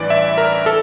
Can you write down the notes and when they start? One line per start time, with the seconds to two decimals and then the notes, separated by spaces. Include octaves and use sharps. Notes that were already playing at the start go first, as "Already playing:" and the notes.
Already playing: A1 G2 E3 D5
0.10 E5
0.38 A#4
0.66 A4